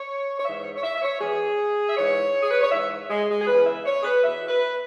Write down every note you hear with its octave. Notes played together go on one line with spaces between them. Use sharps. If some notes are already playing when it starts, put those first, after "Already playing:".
Already playing: C#5
C#5
G#2 E3 E5
C#5
C#5
E5
E5
C#5
E2 E3 G#4
E5
G#2 E3 C#5
G#4
B4
C#5
G#2 E3 E5
G#3
G#3
G#4
E2 C#3 E3 B4
E5
C#5
G#4
B4
E2 B2 E5
B4